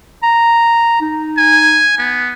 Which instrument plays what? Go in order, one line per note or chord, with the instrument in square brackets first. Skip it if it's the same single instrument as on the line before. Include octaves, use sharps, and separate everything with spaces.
[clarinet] A#5
D#4
[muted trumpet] G#5
B3